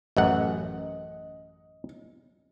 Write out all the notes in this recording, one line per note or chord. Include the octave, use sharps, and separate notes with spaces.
A1 F#2 D#5 F#5